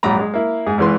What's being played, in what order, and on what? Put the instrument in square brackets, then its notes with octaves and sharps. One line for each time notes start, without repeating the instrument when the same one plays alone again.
[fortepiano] A#1 G#2 F#3 A#5 B5
G#3
A#3 E4
G#2 G#4
G#1 G#2 E3 B4 C6